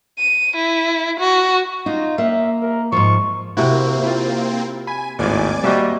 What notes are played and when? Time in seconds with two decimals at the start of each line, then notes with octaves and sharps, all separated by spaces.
0.19 D#7
0.56 E4
1.20 F#4
1.86 D#4 F4
2.18 A#3 E5
2.62 A#4
2.92 G#2 F3 C#6
3.57 C3 A#3 C4 E4 F#4
4.03 E4 F4
4.87 G#5 B5
5.19 G#1 D#2 A2 D5 G#5 D6
5.64 G3 A#3 C4 F#4 D#5 E5